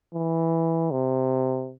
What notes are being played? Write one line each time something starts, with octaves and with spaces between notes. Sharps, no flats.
E3
C3